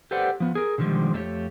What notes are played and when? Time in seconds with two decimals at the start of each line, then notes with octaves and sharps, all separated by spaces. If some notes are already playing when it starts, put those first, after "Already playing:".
0.11 G4 A4 B4 C5 D5 F#5
0.40 F3 B3
0.55 G#4 A#4
0.78 B2 D3 D#3 F3 G3 G#3
1.13 F2 A3 D4 G4 C#5